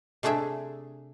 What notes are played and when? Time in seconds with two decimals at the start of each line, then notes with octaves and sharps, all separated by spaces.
0.23 C3 A3 D4 G#4 E5